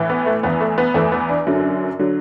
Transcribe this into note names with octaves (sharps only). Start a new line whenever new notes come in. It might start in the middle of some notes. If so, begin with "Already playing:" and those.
Already playing: A2 E3
B3
A3
E2 E3 B3
A3
B3
E2 E3 A3
B3
D4
F#2 D3 F#3
D3 F#3